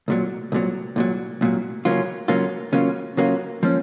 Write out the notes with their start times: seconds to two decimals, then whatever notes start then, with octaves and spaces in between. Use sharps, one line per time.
0.08 C2 A#2 F#3
0.52 C2 A#2 F#3
0.96 C2 A#2 F#3
1.41 C2 A#2 F#3
1.85 C#3 F#3 A#3 C#4 F4
2.28 C#3 F#3 A#3 C#4 F4
2.73 C#3 F#3 A#3 C#4 F4
3.17 C#3 F#3 A#3 C#4 F4
3.63 F3 A#3 C#4